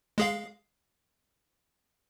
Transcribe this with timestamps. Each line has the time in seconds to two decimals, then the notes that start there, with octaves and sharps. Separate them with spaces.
0.18 G#3 G#4 F5